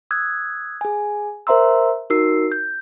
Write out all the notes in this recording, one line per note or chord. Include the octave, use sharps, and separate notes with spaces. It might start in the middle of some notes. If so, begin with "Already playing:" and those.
D#6 E6 F#6 G#6
G#4 G#5
A#4 C5 E5 A#5 C6 E6
D#4 F#4 A#4 E6 C7
G6